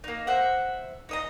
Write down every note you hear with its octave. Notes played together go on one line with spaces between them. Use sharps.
A#3 D#4
C5 E5 F#5
D#4 D#5 A#5